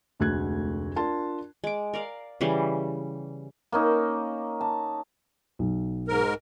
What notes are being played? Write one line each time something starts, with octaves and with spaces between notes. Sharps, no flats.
F1 D2 G#3 F#4 F#6 G#6
D4 F4 A#4 A5 C6
G#3 D6
A#4 D5 F5
C#3 E3 G3
A#3 C#4 D#4
A5
B1
G#2 A#4